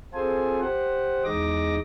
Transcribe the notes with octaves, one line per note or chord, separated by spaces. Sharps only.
C4 F4 G#4 A4 C5 G#5
G4 C5 F#5
E2 G#3 D#4 D#5 D6 A#6